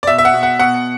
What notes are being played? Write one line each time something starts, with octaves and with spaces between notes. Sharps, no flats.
D5
B2 E5
E5
F#5
B2
F#5
B2 F#5